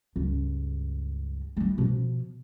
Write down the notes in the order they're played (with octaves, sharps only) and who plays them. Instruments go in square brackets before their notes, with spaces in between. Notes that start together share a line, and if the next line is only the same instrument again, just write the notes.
[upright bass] C#2 G2
G3 E4
B2 F3